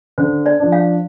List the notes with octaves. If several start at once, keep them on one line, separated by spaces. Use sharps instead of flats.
D3 C5
D5
F3 D4
F5